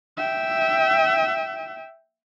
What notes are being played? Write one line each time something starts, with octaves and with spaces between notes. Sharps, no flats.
E5 G5